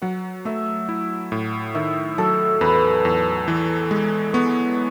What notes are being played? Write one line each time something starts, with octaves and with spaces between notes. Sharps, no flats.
F#3 F#5
A3 E5
E4
A2
D#3 E5
F#3 A4
E2 B4
E2
E3
G#3
B3 C#5